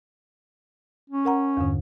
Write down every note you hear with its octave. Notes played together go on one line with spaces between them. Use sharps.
C#4
A#4 F#5 A#5
E2 G2 D3